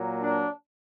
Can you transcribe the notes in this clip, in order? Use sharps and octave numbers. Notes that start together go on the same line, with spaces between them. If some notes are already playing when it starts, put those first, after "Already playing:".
Already playing: A#2 F#3 A#3
D4